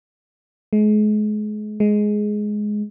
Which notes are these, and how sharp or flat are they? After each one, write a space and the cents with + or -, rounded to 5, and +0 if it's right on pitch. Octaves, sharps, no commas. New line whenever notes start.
G#3 +35
G#3 +10